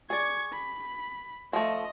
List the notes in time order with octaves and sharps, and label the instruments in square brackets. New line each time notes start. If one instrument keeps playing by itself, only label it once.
[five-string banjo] G#4 D5 [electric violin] C#6 G#6
[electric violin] B5
[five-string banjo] F3 A3 [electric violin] D#5